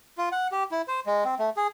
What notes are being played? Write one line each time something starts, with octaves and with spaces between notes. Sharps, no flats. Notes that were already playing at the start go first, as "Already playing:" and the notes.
F4
F#5
G4
E4
C5
G#3
C4
A3
G#4